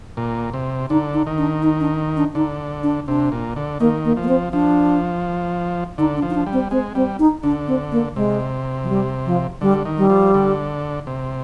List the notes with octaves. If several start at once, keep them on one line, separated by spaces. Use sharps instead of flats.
A#2
C3
D3 D#4
D#4
D#3
D4
D#4
D4
D4
D3 D#4
D4
C3 D4
A#2
D3
D#3 A#3
A#3
F3
A#3
C4
F3 D4
D3 D#4
D4
F3
D#4
D4
G3
C4
G#3 C4
G3 C4
D#4
D3 D4
C4
A#3
C3 G#3
F3
G3
F3
D3 G3
D#3
G3
F3
D3
C3